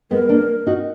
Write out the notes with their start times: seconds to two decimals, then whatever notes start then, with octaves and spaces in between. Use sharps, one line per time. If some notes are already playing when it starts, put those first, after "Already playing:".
0.11 G#3 B3 A#4
0.29 A#3 D4
0.66 D#4 F#4